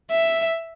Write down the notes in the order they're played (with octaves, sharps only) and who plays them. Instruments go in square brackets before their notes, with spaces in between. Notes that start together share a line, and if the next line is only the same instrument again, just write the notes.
[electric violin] E5